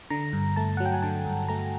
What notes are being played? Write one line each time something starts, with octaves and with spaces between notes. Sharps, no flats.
D3 A#5
G2
A3 A5
F#3 F#5
G5
G#5
D3 A5
G2
A3 A#5